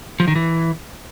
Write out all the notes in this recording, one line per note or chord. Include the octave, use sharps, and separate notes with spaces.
F3
D#3
E3